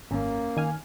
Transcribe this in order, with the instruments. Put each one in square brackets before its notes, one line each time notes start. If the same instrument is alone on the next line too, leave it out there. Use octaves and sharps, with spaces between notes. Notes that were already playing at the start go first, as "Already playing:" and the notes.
[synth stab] G#1 [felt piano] F#2 [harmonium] A#3
[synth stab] D#3 G#5 F6